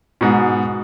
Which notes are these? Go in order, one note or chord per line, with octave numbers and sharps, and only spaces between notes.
G#2 B2